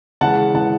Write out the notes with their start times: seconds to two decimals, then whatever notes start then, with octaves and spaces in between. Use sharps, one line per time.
0.21 C#3 E3 G#3 F#5 A5
0.54 C#3 E3 G#3 F#5 A5